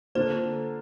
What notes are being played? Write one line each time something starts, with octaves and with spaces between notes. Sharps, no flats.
D3 A#3 D4 F4 C5